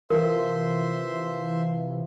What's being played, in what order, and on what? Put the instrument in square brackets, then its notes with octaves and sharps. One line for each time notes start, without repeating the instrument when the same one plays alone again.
[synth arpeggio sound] C3 E3 [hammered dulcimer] F3 [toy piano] A#4 [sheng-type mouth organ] C5 E5 C6